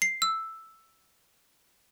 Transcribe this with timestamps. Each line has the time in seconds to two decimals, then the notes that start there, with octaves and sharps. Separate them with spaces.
0.02 C7
0.22 E6